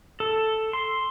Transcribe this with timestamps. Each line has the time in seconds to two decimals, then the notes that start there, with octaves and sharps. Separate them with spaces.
0.20 A4
0.73 C6